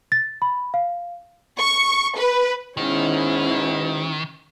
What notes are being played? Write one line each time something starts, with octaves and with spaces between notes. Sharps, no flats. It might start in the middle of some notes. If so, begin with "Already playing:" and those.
A6
B5
F5
C#6
B4
G#2 B2 D#3 C#4 E4